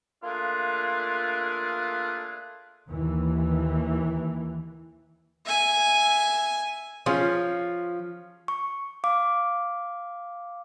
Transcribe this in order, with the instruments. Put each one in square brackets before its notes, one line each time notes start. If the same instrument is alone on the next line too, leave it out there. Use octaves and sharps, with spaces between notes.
[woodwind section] A3 A#3 D4 F4 G#4 B4
[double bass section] D#2 E3
[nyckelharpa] E5 G#5
[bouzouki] F3 [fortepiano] C#4 F4 G#4
[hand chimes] C#6
F5 D6